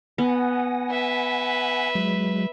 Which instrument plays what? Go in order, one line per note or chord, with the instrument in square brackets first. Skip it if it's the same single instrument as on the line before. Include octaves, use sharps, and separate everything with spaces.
[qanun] B3 [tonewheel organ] F#5 G#5 A#6
[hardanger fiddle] B4 E5
[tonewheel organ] F#3 G#3